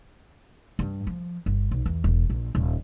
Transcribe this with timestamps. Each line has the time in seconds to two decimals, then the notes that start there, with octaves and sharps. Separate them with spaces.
0.79 G2
1.07 F3
1.46 G1
1.71 B1
1.86 E2
2.04 E1
2.30 A#1
2.55 D#1